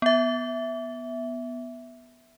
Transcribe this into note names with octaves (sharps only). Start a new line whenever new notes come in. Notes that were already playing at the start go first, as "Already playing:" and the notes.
B3 E5